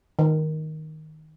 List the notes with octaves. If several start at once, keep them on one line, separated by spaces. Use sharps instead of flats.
D#3